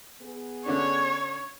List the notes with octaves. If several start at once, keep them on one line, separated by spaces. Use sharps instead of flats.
B3 G#4
D3 C#4 D4 C#5